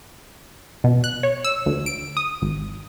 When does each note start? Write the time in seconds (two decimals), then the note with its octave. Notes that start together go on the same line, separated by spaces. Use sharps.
0.84 B2
1.04 F#6
1.23 C#5
1.44 E6
1.66 D2
1.86 D7
2.17 D#6
2.42 G#1